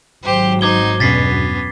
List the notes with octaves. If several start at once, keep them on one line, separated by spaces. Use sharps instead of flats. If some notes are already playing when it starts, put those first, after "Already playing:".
G#1 F#3 G4 C5
D#4 C5 D6 G#6 G7
E2 G2 B2 B3 C#4 A6 B6 C7